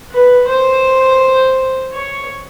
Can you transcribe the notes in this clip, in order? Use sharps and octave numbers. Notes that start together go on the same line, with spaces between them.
B4
C5
C#5